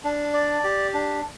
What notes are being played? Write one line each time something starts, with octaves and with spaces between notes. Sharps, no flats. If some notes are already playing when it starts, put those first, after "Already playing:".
D4
D5
G4
D4